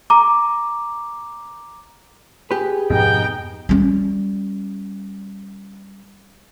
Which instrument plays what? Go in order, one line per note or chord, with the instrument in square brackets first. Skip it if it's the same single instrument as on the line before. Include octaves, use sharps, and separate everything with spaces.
[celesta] A#5 D6
[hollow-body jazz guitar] G4 B4 [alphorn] G#4
[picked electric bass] F2 G#2 B2 [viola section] B3 D#4 G5
[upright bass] G3 C#4